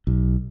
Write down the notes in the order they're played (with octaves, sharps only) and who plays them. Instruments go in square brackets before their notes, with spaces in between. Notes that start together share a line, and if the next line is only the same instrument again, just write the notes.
[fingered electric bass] B1